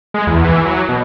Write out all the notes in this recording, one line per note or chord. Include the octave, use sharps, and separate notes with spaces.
G#3
E2
E3
F#3
B2